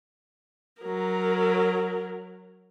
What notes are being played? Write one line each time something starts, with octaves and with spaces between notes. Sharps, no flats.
F#3 A#4